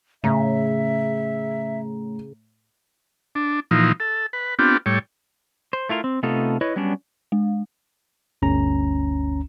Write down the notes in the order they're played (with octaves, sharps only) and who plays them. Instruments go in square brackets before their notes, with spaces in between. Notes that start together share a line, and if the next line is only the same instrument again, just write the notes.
[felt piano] A2 A#5 [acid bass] C#3 [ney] E5
[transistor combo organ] D4
A#2 E3 F3 D#4
A4
B4
B3 C4 D4 F4 G4
A2 G3 C#5
[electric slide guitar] C5
A3 E4 F4 A#4
C4
C3 A3 B3 D#4 F4 A4
E4 B4 C#5 D#5
F#3 G3 B3 C#4 D4
[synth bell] G#3
[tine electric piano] G1 D2 C#4 A#5